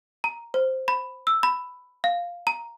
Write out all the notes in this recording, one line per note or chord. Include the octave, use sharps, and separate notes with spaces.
A#5
C5
B5
E6
B5
F5
A#5